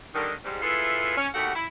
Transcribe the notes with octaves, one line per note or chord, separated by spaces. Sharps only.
D3 D#3 G3
G#2 G3
E4 F4 G#4 A4 B4 E5
C#4
D#2 A3 F#4 G4 F#5
E4